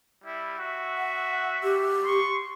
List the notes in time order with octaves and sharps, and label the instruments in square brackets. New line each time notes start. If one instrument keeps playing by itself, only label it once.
[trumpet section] G3 E4
F#4 E5
[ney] F#5
G4
[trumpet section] C6 C#6